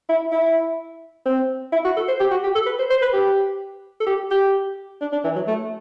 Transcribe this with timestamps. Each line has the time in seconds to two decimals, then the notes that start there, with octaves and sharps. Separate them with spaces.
0.09 E4
0.32 E4
1.26 C4
1.73 E4
1.85 F#4
1.97 A4
2.08 C5
2.20 G4
2.31 F#4
2.43 G4
2.55 A4
2.66 B4
2.79 C5
2.90 C5
3.02 B4
3.13 G4
4.01 A4
4.07 G4
4.31 G4
5.01 D4
5.12 D4
5.24 E3
5.36 F#3
5.47 A3